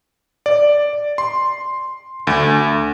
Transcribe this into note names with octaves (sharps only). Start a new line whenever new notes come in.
D5
C6
D2